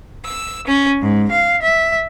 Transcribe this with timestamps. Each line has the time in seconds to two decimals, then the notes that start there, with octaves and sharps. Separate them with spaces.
0.25 E6
0.67 C#4
1.00 G#2
1.30 F5
1.61 E5